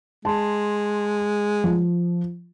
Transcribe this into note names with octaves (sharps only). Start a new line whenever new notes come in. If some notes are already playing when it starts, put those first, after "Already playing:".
G#3 A5 C6
F3